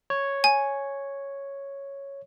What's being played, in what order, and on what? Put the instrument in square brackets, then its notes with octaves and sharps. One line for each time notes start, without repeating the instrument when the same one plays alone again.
[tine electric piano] C#5
[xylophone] G#5